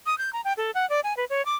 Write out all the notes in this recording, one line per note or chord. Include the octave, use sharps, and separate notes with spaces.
D#6
G6
A#5
G5
A4
F#5
D5
G#5
B4
C#5
D6